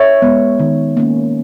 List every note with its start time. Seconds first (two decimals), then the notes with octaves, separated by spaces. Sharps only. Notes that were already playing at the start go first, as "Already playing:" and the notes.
Already playing: C#5 E5
0.22 G#3 B3
0.60 D#3
0.97 A#3 C#4